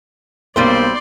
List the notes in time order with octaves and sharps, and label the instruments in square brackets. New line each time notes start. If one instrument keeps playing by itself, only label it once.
[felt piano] B1 A#3 [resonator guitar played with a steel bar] G3 C4 C5 [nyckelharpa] D5 C6